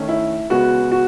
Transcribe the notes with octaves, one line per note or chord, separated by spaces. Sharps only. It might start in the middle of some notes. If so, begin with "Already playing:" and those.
Already playing: D#3 A3 C#4
E4
C#3 G#3 B3 F#4
F#4